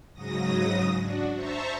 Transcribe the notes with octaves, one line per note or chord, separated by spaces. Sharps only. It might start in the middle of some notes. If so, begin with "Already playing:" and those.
G#2 C#3 F#3 D#6 A#6
D4 F#4
C5 E5 A5 A#5 C#6